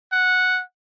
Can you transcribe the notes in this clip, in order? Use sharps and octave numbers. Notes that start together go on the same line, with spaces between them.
F#5